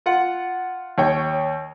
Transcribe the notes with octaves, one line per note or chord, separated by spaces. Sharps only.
F4 F#5
D#2 C#5 G5